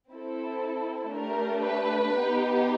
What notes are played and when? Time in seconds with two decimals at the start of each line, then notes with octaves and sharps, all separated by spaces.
0.12 C4 E4 A4
1.13 A3 D4 G4 A#4
1.64 B4
2.15 B3 D#4 G4